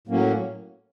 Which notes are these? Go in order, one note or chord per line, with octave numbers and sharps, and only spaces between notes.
A2 F#3 A#3 C#4